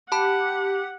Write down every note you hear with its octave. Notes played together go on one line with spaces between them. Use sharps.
G4 F#5 A5 B5